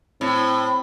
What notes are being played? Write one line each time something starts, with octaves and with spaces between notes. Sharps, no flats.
A2 C4